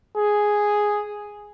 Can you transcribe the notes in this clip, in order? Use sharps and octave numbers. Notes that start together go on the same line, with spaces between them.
G#4